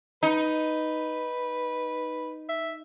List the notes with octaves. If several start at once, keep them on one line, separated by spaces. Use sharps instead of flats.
D#4 B4
E5